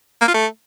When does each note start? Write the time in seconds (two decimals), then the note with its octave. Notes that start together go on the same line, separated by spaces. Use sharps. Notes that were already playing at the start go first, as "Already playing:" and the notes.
0.21 A#3
0.28 F4
0.34 A3